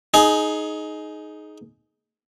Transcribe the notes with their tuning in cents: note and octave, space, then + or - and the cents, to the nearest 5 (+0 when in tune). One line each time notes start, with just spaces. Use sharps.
D#4 +0 G#4 +20